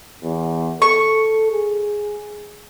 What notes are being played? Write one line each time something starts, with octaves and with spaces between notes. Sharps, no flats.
E2
A4 C#6
G#4